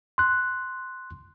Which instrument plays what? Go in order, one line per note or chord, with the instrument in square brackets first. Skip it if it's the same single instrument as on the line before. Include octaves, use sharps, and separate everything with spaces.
[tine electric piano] C6 F#6